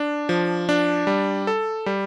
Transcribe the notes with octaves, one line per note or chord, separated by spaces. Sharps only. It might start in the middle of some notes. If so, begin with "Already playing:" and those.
Already playing: D4
F3
D4
G3
A4
G3